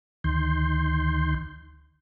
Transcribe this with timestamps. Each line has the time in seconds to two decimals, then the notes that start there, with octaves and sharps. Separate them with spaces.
0.24 D2 D#3 C6 G6